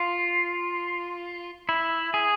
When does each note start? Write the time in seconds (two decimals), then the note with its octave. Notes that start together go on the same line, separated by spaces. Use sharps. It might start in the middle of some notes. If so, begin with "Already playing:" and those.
Already playing: F4
1.69 E4
2.14 G#4